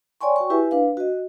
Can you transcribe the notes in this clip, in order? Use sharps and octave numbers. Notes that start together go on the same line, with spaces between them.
C#5 D5 G5 G#5 C6 C#6
F#4 G5 C#6
E4 G4 B4 E5 G#5
D4 B4 F5
F#4 D#5